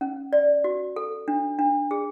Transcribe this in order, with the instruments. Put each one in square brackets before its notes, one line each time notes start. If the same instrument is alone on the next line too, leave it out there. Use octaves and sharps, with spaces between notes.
[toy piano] C#4
D5
F#4
A4
D4
D4
G#4